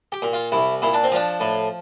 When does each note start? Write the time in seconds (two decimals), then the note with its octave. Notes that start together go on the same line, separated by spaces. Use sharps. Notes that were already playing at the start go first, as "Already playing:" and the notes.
0.12 G4
0.22 A#2
0.33 F4
0.52 C2 E4
0.82 A#2 E4
0.93 D4
1.04 C4
1.12 F3 D4
1.40 A2